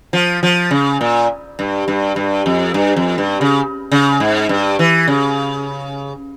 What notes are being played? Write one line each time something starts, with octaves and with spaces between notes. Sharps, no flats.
F3
F3
C#3
A#2
G2
G2
G2
F2
G2
F2
G2
C#3
C#3
G#2
G2
E3
C#3